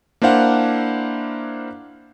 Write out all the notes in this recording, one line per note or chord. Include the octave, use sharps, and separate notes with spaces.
A#3 D4 E4 C5 F5 F#5